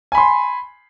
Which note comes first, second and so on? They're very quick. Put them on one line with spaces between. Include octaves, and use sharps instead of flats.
G#5 B5 C6